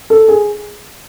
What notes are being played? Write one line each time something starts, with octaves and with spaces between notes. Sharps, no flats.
A4
G#4